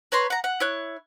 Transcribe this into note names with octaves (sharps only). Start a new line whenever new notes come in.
B4 C#5 A#5 C6
F#5 A#5
F#5
E4 C#5 F#6